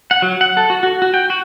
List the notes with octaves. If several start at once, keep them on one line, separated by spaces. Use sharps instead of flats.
F#5
F#3
F#5
A4
F#4
F#4
F#4
G5
F#4